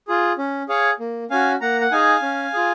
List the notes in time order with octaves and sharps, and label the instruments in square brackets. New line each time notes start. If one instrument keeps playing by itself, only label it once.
[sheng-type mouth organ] F4 G#4
C#4
G#4 C#5 F5
A#3
C#4 F#4 F5 G#5
A#3 F#5 A#5
F#5
D#4 G#4 F5 G#5
C#4
F4 G#4